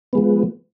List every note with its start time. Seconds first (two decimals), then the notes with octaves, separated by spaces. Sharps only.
0.13 F3 G#3 B3